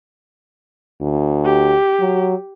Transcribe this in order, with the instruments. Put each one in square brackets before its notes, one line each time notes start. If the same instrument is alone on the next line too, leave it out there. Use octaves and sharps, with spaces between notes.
[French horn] D2
[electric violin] G4
[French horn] F#3